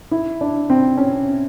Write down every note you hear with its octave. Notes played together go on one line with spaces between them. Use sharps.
E4
D4
C4
C#4